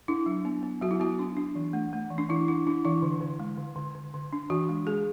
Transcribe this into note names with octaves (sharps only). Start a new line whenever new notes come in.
D4 E4
F#3
B3
B3
F#3 F#4
E4
B3 F#4
D4
D4
E3
A3
A3
E3
D4
E3 E4
D4 E4
D4 E4
E3 E4
D3
D3
G#3
D3
D3
D3
D3
D4
E3 F#4
G#3
G#3 G#4